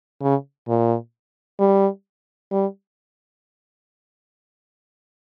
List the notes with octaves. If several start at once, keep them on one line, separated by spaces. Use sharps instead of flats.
C#3
A#2
G3
G3